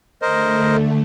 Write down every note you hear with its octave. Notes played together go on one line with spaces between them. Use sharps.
D3 A3 A#4 C5 D#5